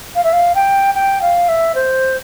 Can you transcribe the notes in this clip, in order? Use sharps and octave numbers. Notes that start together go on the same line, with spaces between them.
F5
E5
F5
G5
G5
F5
E5
C5